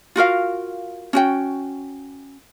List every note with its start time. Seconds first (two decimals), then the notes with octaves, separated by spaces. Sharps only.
0.16 F4 F#4 A#4 F5
1.13 C#4 F#4 G5